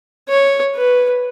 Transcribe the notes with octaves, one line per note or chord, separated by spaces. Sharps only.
C#5
B4